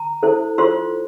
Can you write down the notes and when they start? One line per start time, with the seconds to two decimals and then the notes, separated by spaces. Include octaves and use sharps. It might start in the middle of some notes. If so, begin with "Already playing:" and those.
Already playing: A#5
0.23 E4 A4 C5
0.58 F4 A4 C5 C6